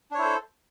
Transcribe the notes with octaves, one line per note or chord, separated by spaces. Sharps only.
D4 E4 A4 C5 C#5